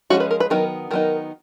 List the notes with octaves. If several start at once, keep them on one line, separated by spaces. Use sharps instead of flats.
F3 G#3 C#4 F#4
B4
A#4
B4
D#3 F#3 B3 D#4 A#4
D#3 F#3 B3 D#4 A#4